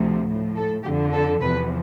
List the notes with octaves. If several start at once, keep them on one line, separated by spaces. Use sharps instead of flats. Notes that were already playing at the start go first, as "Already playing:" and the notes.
Already playing: D2 C3 F3
A2 F3
A4
F2 D3 F3 G4
A4
E2 C3 F3 B4